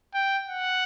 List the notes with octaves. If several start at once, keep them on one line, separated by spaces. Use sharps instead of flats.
G5
F#5